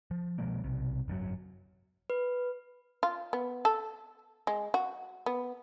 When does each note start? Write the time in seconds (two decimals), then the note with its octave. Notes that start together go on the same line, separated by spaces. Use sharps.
0.11 F3
0.38 B2 F3 G#3 A#3
0.64 B1 C3
1.08 G#1 F#2 A2 F#3
2.10 B4
3.03 F4
3.33 B3
3.65 A4
4.47 G#3
4.74 F#4
5.26 B3